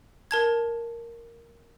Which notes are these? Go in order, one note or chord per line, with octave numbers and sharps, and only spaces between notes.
A#4 A5 G#6